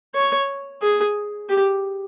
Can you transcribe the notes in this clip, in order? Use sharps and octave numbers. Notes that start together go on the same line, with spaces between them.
C#5
G#4
G4